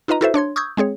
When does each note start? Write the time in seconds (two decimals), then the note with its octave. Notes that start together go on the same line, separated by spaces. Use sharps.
0.08 D#4 F4 B4 D#5 A#5
0.21 E4 F#4 A4 B4 C5 E5
0.34 D4 C#5 C6 G#6
0.56 C#6 D#6 E6 G6 G#6
0.77 G#3 C4 G#4 C#5